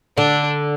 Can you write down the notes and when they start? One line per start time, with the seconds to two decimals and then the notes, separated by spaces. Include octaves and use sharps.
0.17 D3 D4